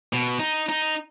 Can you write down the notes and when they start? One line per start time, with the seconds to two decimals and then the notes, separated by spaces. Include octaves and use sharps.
0.13 B2
0.39 D#4
0.69 D#4